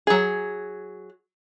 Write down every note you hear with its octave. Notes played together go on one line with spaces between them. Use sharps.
F#3 G#4